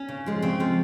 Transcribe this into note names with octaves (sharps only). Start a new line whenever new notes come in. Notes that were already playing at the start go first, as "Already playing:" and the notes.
Already playing: C#4
C#3
F3 G#3
C#3 C4
F3 G#3